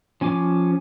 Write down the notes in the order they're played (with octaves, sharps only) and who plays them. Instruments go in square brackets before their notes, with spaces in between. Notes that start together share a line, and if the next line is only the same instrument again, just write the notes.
[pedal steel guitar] F3 C#4 G#5 D6